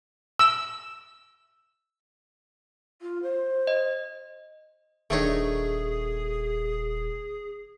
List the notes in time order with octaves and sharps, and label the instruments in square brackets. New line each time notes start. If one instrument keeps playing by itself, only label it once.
[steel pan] E6
[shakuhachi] F4
C5
[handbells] D#5
[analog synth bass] D#1 [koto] D#3 D4 D#4 [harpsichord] A3 C#5 [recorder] G#4